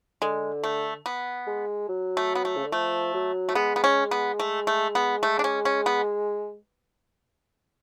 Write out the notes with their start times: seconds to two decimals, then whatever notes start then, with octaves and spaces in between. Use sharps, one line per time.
0.22 D3 G#3
0.64 A3
1.06 B3
1.47 G#3
1.89 F#3
2.17 A3
2.35 B3
2.45 A3
2.57 C#3
2.64 D3
2.72 F3 A3
3.14 F#3
3.49 A3
3.55 G#3 B3
3.76 B3
3.84 C#4
4.11 B3
4.40 A3
4.67 A3
4.95 B3
5.23 A3
5.39 D4
5.44 C#4
5.65 C#4
5.86 B3